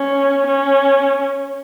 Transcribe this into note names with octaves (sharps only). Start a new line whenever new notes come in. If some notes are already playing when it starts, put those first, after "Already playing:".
Already playing: C#4
C#4